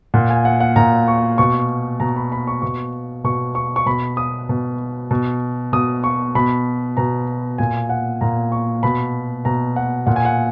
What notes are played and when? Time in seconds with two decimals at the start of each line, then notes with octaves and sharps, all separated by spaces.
0.14 A#2 F#5
0.30 G#5
0.45 F#5
0.60 F#5
0.76 A#2 A#5
1.08 C#6
1.38 B2 C#6
2.00 B2 A#5
2.16 B5
2.32 B5
2.47 C#6
2.62 B2 C#6
3.24 B2 C#6
3.55 C#6
3.76 C#6
3.86 B2 B5
4.17 D#6
4.49 B2
5.11 B2
5.73 B2 D#6
6.04 C#6
6.35 B2 B5
6.97 B2 A#5
7.58 A#2 G#5
7.89 F#5
8.21 A#2 A#5
8.52 C#6
8.83 B2 B5
9.45 B2 A#5
9.76 F#5
10.07 A#2 F#5
10.16 G#5
10.25 F#5